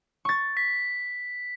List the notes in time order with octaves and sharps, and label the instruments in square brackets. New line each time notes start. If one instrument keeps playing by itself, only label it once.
[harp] C#6 A6
[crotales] B6